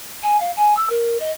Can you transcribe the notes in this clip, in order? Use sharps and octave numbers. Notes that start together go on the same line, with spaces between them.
G#5
F5
G#5
E6
A#4
D#5